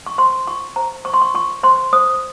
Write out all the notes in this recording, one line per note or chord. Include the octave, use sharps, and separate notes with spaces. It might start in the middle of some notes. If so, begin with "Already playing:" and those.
C#6
C5 C6
F4 C#6
C5 A#5
C5 C#6
C6
C#6
F4 C#6
C5 C6
C5 D#6